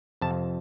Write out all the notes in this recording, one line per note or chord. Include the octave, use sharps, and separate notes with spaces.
F2 C3 F3 A5